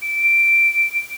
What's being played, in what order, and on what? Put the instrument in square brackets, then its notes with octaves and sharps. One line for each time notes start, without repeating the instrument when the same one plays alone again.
[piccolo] D7